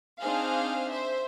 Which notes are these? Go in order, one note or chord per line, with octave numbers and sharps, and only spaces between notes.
C4 D4 D#4 G#4 C5 F5
C5 E5